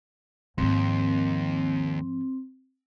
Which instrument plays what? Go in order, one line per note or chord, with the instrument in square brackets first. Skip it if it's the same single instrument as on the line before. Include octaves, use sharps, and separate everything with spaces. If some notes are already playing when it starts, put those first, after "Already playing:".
[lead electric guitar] D#2 [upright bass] G#2 F3 [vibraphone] C4